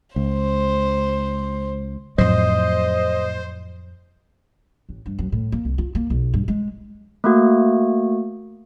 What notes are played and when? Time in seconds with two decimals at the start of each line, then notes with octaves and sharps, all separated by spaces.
0.16 C#2 C5
2.18 F2 A2 F#3 C5 D#5
4.89 A1
5.06 G2
5.19 F#2
5.32 A2
5.52 A#3
5.65 C2
5.78 F4
5.95 A#3
6.10 B1
6.34 G2
6.48 G#3
7.24 A3 A#3 F#4